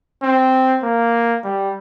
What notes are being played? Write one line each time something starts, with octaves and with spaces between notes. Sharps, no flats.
C4
A#3
G3